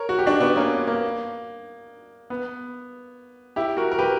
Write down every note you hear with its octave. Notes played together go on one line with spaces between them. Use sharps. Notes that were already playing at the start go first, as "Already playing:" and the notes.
Already playing: A#4 C#5
F#4
G4
D4 F#4
B3 D4
A#3 C#4
A#3
B3
E4 G4
F#4 A#4
A#4
G4 B4